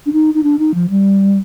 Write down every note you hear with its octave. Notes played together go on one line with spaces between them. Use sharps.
D4
D#4
D#4
D4
D#4
F3
G3